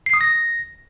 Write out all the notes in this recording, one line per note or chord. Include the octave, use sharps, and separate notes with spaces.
C7
D#6
A#6